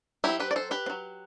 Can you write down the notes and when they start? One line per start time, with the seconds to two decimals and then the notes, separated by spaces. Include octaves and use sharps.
0.24 F#3 C4 E4 G4
0.40 G4 B4
0.51 D5
0.56 A4 C5
0.71 G4 B4
0.86 C4
0.90 F#3